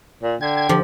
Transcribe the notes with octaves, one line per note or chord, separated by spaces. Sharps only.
A#2
D3 G5 G#6
D3 F3 G4